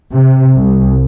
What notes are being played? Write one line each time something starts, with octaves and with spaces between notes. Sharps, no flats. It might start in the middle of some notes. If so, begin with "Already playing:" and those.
C3
C2